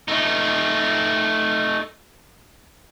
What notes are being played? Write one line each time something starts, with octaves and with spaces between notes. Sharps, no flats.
A3 D#4